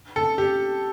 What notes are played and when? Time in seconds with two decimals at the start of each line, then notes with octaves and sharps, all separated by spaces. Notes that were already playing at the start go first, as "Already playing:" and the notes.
0.16 A4
0.38 G4